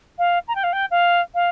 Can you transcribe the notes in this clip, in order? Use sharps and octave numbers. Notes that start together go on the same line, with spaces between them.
F5
A#5
G5
F5
G5
F5
F5